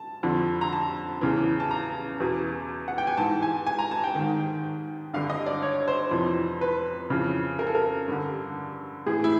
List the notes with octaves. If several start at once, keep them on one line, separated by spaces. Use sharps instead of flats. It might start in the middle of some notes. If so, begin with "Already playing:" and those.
Already playing: A5
F2 D3
A#5
A5
E2 C#3 E3
A5
A#5
E2 B2
F#5
G5
G#5
G#2 E3 A5
G#5
G#5
A#5
A5
G5
G#2 D#3
G2 D3 F5
D#5
D5
C#5
C5
F2 C3 E3
B4
F2 C#3 E3
A#4
A4
A#4
G2 D3
A2 E3 G#4
E4